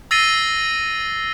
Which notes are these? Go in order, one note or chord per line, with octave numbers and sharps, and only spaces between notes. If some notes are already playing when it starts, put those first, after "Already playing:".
E6 A6 A#6 C7 D#7 G7